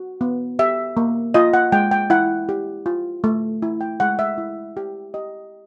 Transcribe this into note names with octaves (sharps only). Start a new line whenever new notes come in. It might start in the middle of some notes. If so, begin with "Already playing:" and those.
Already playing: F#4
B3
G4 E5
A#3
F4 D#5
F#5
G#3 G5
G5
E4 F#5
G4
F4
A3
E4
G5
G#3 F#5
E5
E4
G4
G4 D#5